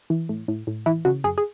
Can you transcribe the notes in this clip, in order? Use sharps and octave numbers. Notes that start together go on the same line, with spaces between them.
E3
A2
A2
A2
E3 E4
C#3 F#4
F#2 G#4
G#4